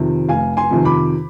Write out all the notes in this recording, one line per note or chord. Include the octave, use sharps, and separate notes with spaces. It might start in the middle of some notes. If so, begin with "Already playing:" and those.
Already playing: F2 C3 D#3
F1 F5 G#5
G#5 C6
F2 C3 D#3
B5 D6